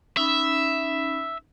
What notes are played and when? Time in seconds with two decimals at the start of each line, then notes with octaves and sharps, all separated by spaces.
0.17 C#4 D#4 E5 B5